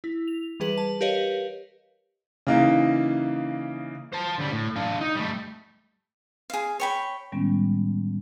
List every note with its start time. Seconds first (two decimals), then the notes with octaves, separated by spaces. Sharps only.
0.04 E4
0.28 F7
0.60 E3 G3 G#4 B4 F#7
0.77 A5
1.01 G4 A#4 B4 C#5 D#5 F5
2.47 C#3 E3 A#3 D#4 E4
4.13 C5 A5
4.39 D2 G3
4.52 A2
4.76 D4 F4
5.01 D#4
5.15 G3 A3
6.50 G#4 F5
6.80 C#5 G5 B5
7.32 A2 D#3 G3 G#3 B3 C#4